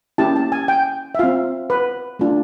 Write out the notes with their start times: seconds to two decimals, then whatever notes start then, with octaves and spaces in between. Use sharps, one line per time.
0.18 A#3 C#4 E4 G4 A5
0.36 A5
0.52 G#5
0.68 G5
1.15 E5
1.19 C4 F4 F5
1.70 B4
2.19 A3 D4 F4